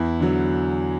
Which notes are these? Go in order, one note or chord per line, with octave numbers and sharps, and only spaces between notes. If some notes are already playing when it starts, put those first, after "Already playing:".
Already playing: E2 E4
D3 F#3